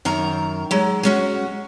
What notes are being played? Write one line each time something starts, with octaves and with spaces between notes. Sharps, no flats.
F#2 D#3 A#4 A#5
F#3 G#3
G#3 C#4 F#4